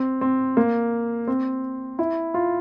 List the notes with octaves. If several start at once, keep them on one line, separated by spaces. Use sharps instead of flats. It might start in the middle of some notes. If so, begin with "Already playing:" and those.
Already playing: C4
C4
A#3
C4
E4
F4